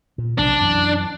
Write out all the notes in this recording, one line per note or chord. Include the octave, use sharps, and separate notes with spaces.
A#2
B1 C3 F3 D4
F#2 E3